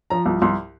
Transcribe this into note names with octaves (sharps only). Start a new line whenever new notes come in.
F3 A#5
C2
C2 C6